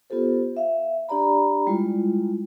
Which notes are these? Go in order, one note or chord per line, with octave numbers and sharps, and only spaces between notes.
B3 F4 G4 A4 C5
E5 F5
D4 G4 D5 A#5 B5
G3 G#3 E4 F4